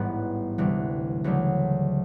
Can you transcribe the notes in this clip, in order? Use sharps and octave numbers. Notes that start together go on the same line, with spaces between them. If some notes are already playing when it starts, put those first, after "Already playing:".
Already playing: A1 G#2 E3 G3 B3
D2 C3 E3 G3
D2 C#3 F#3 A3 D4